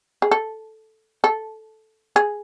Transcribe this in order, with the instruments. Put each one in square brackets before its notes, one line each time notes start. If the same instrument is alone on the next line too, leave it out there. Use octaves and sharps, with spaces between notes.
[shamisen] G#4
A4
A4
G#4